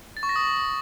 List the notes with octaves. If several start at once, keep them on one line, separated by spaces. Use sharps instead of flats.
A6
C#6
A#6
D#6